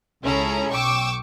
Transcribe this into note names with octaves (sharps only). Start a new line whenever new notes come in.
C#2 C#4 E4 G#4 A4 A#5
B1 G5 C#6 D6 E6